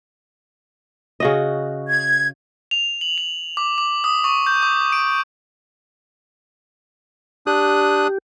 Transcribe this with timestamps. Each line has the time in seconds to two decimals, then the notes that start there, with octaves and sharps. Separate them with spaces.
1.20 C#3 F#4 D#5
1.88 G#6
2.71 F7
3.01 F#7
3.18 F7
3.57 D6
3.78 D6
4.04 D#6
4.24 C#6
4.46 G6
4.62 D6
4.92 D7
7.47 D4 G4 D#6 F#6